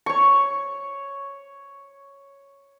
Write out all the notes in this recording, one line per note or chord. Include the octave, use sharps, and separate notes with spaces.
C#5 C#6